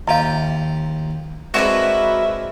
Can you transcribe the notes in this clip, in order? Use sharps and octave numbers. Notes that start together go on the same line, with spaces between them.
D#2 F4 F5 G5 A#5
G#3 C4 D4 F#4 A#4 B4 E5